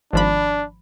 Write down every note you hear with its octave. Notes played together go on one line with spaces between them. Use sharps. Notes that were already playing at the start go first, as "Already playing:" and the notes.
G#1 F3 D4 B5